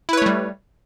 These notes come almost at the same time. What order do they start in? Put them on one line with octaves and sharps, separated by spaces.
E4 B4 C#5 A3 G3